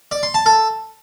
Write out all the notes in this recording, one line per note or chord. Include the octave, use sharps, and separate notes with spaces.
D5
C6
A5
A4